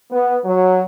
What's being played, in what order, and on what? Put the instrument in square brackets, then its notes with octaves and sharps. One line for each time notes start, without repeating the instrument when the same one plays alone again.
[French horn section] B3
F#3